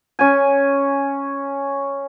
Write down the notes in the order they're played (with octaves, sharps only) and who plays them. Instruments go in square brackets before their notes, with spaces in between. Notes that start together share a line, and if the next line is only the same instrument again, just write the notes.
[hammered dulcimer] C#4 G#5